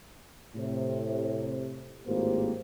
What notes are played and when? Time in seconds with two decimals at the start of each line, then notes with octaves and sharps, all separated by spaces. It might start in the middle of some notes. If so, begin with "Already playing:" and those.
0.56 A2 C3
2.06 G#1 A2 A#3 G4 C5